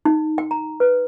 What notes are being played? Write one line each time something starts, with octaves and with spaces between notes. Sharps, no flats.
D#4
G5
A#5
B4